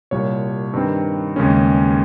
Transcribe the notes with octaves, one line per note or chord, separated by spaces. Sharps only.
C2 A#2 G3 C#5
G2 D#3 G3 C4
D#2 C#3 G#3 C#4